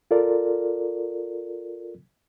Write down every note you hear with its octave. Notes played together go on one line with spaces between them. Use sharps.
F4 A4 A#4 D5